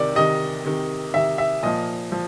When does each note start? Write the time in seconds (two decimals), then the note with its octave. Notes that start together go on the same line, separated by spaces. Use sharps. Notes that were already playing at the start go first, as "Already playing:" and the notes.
Already playing: C3 D#3 D5
0.15 C3 D#3 D#5
0.65 C3 D#3
1.14 C3 D#3 E5
1.38 E5
1.63 A#2 F3 D#5
2.12 F3